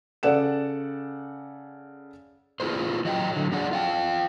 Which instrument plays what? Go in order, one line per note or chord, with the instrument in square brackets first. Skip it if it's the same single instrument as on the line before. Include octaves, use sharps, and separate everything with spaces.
[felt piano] C#3 A4 D5 F#5 E7
[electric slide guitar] E4 F4 G#4 B4 C5
F#3 D#5 F#5 G5
D3 F#3
F#3 D4 G#4 D5 F#5
F4 F5 G5